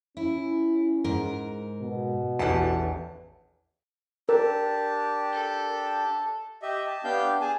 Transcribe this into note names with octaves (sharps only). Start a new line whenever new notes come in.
C#4 E4
G#2 A#4
B2
A1 E2 D4 A5
D4 G4 A#4 A5
A4
G4 D#5 E5
A5
B3 D4 G4 F5 G5 G6
G#4 G#5 A5